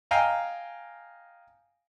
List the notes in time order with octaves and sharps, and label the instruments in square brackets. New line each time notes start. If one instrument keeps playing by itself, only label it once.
[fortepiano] D#5 F5 G5 G#5 A#5